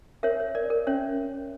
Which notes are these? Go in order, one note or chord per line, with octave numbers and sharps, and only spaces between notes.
A#4 C#5 E5
C#5
A#4 D5
A#4
C#4 C#5 E5